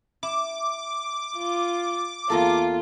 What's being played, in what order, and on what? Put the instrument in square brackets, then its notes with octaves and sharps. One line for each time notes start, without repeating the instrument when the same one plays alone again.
[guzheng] E4 [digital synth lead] D6
[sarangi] F4
[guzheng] E2 A#3 A4 [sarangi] F4